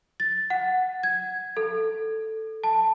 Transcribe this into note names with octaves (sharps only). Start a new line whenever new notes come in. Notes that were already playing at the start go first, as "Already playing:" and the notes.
A6
F#5
G#6
A4
A5